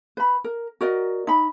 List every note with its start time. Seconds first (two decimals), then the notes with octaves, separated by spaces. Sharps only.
0.17 B4 B5
0.44 A#4
0.81 F#4 A#4 D5 D#5
1.27 D#4 B5